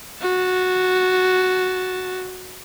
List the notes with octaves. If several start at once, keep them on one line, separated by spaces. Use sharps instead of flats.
F#4 A5